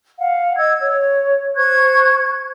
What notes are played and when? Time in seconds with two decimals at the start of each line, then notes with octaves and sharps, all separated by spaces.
0.18 F5 F#5
0.57 D#5 E6 G#6
0.79 C#5
1.55 C5 C#6 F#6 G#6